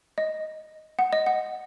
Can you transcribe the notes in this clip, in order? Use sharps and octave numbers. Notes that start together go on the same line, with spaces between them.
D#5
F#5
D#5
F#5